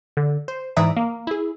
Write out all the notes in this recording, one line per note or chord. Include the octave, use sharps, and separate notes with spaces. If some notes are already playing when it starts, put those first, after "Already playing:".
D3
C5
G#2 E3 D5 E5 A#5 D#6
A#3
E4 G#4